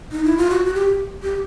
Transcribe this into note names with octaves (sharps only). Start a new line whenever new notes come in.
D#4
E4
F4
F#4
F#4
G4
G4